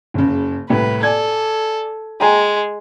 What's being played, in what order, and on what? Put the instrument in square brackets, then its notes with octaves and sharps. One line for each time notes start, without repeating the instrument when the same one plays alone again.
[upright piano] F#1 C#3
[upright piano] C2 A2 [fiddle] B4
[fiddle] A4 [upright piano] D5 G#5 G#6
[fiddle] G#3 [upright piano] G5 G#5 A#5